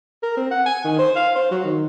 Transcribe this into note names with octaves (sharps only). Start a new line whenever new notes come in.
A#4
C4
F#5
G#5
D#3
C5
F5
C5
F#3
D#3